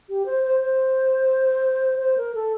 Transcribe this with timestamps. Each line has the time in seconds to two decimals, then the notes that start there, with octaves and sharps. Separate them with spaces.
0.09 G4
0.26 C5
0.43 C5
0.60 C5
1.99 C5
2.17 A#4
2.35 A4